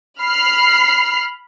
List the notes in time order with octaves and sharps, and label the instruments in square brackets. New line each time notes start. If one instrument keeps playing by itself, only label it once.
[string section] B5 F6 C7